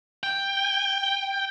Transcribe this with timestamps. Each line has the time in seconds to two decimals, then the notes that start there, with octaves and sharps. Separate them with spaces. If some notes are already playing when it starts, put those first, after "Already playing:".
0.23 G5